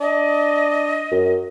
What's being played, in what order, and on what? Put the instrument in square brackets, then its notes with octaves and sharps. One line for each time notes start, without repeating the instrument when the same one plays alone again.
[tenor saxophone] D4 [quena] D#5
[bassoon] F#2